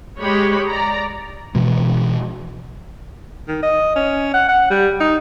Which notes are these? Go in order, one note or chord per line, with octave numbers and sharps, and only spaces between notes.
G#3 G4 C#5 B5
D5 A#5
B2 E3 F3 G#3
D#3
D#5
C#4
F#5
F#5
G3
D#4